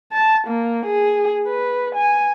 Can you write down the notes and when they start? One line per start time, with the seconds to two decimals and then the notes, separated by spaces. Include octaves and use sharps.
0.13 A5
0.47 A#3
0.86 G#4
1.48 B4
1.95 G#5